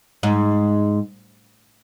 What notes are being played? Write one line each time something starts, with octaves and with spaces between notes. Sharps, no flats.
G#2